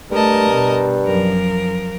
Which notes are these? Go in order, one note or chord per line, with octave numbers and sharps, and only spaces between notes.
G2 A3 A#4 D#5 A5
B2
F#2 F3 A#4